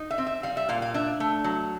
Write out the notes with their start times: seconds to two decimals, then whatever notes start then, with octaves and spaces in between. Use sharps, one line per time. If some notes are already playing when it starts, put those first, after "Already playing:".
Already playing: D#4
0.11 E5
0.18 C4
0.26 E5
0.43 G3 F5
0.57 E5
0.69 A#2 F5
0.82 F5
0.94 D4 E5
1.20 A3
1.44 F#3